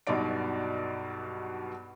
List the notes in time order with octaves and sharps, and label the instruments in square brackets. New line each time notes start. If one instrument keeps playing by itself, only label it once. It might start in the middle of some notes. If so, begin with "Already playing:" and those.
[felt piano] B1 G2 B2 D#4 D5 D7